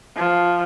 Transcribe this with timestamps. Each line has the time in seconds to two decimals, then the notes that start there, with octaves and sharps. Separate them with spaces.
0.17 F3